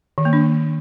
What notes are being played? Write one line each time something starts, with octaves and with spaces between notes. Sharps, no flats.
D#3
A#3
D4